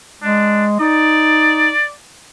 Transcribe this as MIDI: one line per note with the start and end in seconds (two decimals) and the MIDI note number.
0.23 0.78 56
0.23 0.65 62
0.80 1.72 63
0.80 1.90 74